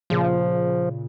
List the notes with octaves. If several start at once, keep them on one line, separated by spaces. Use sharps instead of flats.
A#2 C#3 F3